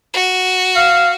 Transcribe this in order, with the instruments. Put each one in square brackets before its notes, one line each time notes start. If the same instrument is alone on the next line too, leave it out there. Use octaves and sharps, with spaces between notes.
[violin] F#4
[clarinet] F5